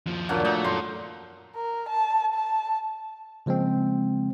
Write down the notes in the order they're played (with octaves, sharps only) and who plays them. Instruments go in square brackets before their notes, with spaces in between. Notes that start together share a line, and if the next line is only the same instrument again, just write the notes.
[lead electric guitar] D#2 F3
[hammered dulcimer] A#2 D3 F#3
[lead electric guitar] A3 [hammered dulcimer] D#4
[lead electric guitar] F#2 A4 [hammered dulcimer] C6
[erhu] A#4
A5
A5
[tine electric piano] C#3 F3 G#3 A#3 C4